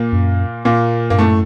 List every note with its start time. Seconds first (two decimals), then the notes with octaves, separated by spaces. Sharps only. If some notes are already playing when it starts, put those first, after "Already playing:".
Already playing: A#2 A#3
0.13 F#2
0.65 A#2 A#3
1.10 G2 A#3
1.18 F#2 A2 A3